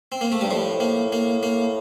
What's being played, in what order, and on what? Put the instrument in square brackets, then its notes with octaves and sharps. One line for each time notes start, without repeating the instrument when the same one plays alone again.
[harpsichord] C4
A#3
A3
[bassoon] G2 [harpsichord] G3
[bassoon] A2 [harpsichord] F3
[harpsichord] A#3
A#3
A#3